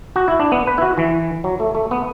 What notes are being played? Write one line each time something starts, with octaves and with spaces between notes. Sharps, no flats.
F#4
E4
D4
B3
B4
E4
F#4
E3
F#3
A3
A3
B3